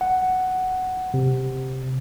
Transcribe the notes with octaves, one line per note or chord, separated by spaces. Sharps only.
F#5
C3